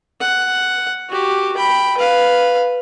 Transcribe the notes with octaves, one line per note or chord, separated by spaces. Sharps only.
F#5
F#4 G4
G5 B5
B4 F5